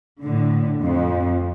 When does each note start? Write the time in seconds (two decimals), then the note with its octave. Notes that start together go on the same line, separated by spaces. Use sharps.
0.22 A2 D3
0.82 F2